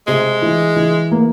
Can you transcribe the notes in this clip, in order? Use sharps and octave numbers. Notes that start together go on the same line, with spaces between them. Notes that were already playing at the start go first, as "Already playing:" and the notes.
C3 G#3
E3
E3
A#3